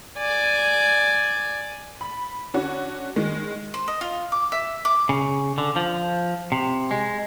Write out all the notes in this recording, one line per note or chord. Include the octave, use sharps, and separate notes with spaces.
D5 G#5
B5
D3 C#4 D4 F#4
D#3 G#3
C5
D#5
F4
D6
E5
D6
C#3
D3
F3
C3
G#3